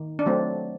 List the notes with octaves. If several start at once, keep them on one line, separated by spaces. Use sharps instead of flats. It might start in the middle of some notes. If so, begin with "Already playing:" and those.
Already playing: D#3
D4
F#3 A3 C4